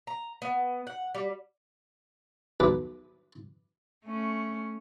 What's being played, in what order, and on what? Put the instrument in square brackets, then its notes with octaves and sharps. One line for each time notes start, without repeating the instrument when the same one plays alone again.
[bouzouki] A#5
B3
F#5
G3
[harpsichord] B1 B4 D6
[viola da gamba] A3 C#4